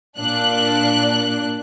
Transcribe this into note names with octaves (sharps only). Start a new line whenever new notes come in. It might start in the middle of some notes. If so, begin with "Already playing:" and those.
A#2 D4 F#6